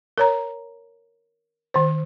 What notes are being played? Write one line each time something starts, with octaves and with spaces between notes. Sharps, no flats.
A#4 C#5 A#5
D#3 C5